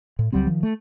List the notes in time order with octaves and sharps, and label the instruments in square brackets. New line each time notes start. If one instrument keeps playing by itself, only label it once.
[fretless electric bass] A2
C#2 F#3 G3 C4
D#3 F3
A3